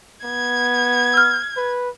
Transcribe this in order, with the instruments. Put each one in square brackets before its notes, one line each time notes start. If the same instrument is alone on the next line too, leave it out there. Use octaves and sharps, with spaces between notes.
[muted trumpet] B3 [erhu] G#6
[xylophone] E6 F6
[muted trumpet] B4